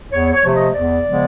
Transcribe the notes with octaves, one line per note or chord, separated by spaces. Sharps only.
E2 C#5
C#5
C3 F3 A3
D#5
E2 D5
C#3 F3 G#3 B3